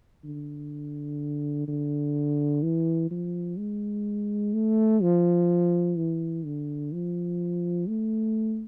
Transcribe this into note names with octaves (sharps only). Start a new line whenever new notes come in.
D3
D3
E3
F3
G#3
A3
F3
E3
D3
F3
A3